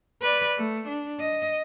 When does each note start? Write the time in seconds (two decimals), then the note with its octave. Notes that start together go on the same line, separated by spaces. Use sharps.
0.22 B4 D5
0.57 A3
0.87 D4
1.20 D#5